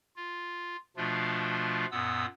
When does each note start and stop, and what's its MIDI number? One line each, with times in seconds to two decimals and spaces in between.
0.16 0.76 65
0.97 1.86 47
0.97 1.86 53
0.97 1.86 57
0.97 1.86 62
0.97 1.86 65
1.92 2.26 42
1.92 2.26 46
1.92 2.26 59
1.92 2.26 87
1.92 2.26 88